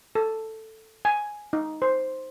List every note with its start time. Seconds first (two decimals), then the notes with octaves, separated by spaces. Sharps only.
0.15 A4
1.05 G#5
1.53 D#4
1.82 C5